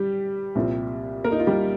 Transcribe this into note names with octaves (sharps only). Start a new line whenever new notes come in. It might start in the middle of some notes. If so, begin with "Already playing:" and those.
Already playing: G3 G4
C2 A#2 F3 C4
A#3 A#4
D#4
F4
G3 G4